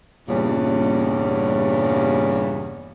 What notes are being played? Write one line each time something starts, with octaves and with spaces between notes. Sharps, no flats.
E2 G2 A#2 C#3 G3 C#4